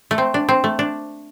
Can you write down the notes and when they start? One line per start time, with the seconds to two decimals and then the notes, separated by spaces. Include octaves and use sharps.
0.11 A3
0.18 C4
0.34 D4
0.49 C4
0.64 A3
0.79 D4